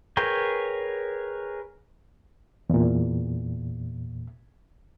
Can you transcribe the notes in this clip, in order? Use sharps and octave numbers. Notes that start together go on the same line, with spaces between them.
G#4 A#4 B4 C#5 G5
E2 A#2